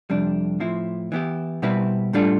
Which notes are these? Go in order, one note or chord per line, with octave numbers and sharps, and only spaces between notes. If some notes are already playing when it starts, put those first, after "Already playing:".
F2 C3 G3 D4
A2 F3 C4 E4
E3 B3 E4 G4
B2 G3 C4 E4 B4
A2 G3 D4 F4 A4